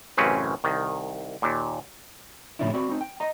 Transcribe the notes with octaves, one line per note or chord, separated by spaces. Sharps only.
A1 F#2 C#3 C4 C#4 B4
C2 D#3
D#2 A#2
A2 C#3 F3 C#4 D4 E4
C4 F#4 D5 B5
C4 D#4
G5
D#5 A#5